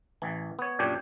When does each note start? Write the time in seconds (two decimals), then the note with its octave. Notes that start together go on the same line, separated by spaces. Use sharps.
0.22 A1 E3
0.59 B3 C#5
0.79 F#2 A#2 D4 G4 C#5